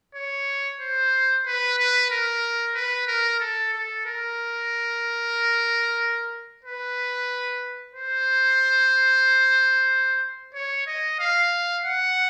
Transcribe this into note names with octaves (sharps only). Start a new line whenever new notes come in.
C#5
C5
B4
B4
A#4
B4
A#4
A4
A4
A#4
B4
C5
C#5
D#5
F5
F#5